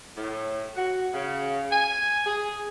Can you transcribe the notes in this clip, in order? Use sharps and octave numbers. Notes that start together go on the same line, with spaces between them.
A2
F#4
C#3
G#5
G#4